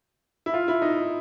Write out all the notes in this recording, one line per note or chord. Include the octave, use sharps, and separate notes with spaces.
E4
F4
E4
D#4